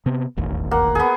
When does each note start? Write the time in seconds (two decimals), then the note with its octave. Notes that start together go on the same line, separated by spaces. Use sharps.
0.06 C3 B3
0.37 E1 A1 D#2
0.71 A#3 F#5
0.95 B3 G#4